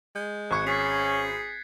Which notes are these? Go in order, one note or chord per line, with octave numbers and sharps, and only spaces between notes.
G#3 G6
G#1 C#6 F#6 G#6 C#7
C#4 G#4 A6 B6 C7
G#6